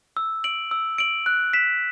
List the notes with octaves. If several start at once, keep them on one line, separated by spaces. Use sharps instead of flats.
E6
D7 F#7
E6
D7 F#7
F#6
B6 E7